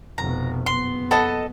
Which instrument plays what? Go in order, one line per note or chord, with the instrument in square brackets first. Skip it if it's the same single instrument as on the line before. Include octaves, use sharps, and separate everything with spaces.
[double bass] F1 B2 [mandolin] A#5
[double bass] F#1 B3 [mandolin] C6
[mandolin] A4 D#5 [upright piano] F#5 A5 B5